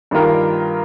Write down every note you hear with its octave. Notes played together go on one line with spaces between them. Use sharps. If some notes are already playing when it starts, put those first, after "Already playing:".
G2 D#3 A#3 F4 A#4